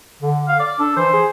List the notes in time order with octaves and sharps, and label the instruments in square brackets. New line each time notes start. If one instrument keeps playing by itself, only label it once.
[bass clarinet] D3
[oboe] F5
D5
[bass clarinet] D4 [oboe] A4
[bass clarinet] E3 [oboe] C5
[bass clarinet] G#4